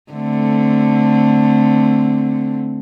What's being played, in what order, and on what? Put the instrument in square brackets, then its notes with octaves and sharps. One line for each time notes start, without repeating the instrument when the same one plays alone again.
[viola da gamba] D3 A3 C4